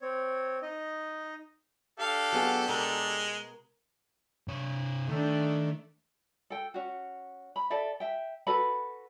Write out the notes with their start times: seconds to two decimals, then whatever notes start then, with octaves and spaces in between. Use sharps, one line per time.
0.01 C4 C#5
0.62 D#4 D#5
2.00 D4 G4 A4 F5
2.32 F#3 B3 G#4
2.68 B2 G#3 A#4
4.48 C3 C#5
5.08 D#3 A3 D4
6.50 A4 G5
6.74 C#4 F#4
7.56 B5
7.70 A4 D5 E5
8.00 E5 G5
8.47 F#4 A4 B4 B5